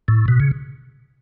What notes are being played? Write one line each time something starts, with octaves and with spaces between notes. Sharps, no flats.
A2
B2
C#3